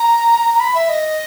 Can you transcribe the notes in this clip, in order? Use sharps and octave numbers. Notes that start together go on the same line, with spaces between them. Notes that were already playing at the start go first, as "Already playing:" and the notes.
Already playing: A#5
A#5
B5
E5
D#5